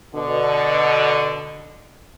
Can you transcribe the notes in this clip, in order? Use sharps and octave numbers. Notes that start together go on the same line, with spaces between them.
B2 D3